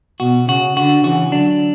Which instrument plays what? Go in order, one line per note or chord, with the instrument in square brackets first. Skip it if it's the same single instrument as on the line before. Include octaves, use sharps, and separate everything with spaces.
[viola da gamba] B2 [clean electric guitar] F#4
[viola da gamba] C#3 [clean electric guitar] F#4
[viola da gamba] D3 [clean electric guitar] F#4
[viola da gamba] C#3 E3 [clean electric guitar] F#4
[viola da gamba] D3 F#3 [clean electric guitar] D4